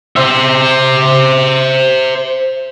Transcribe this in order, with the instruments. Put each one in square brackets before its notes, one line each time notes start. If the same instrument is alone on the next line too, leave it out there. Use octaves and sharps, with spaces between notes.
[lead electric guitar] C5 E5